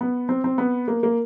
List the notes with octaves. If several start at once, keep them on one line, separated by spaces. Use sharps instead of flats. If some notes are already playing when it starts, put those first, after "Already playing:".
B3
C4
C4
B3
A#3
A#3